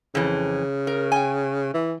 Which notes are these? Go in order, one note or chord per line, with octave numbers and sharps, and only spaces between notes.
F2 C#3 E3
A#4
G5 G#5
E3